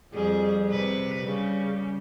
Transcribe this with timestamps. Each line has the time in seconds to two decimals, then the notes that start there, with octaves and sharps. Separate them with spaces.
0.13 F2 G3 G#4
0.69 C3 B4
1.24 C#3 G3